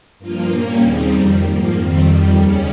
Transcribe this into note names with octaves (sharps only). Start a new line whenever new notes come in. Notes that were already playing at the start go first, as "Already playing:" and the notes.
G2 F3 A#3 F4
A#2 G3 A#3 C#4
D#2 C#3 G3 C4 D#4
F2 D#3 G3
G#2 F3 A#3
F2 D#3 G3 C4
F2 D#3 G3
D#2 C#3 G3 C#4